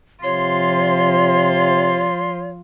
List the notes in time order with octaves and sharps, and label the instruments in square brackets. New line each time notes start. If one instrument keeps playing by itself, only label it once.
[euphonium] C3 [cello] F3 F4 [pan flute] C#5 [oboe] C6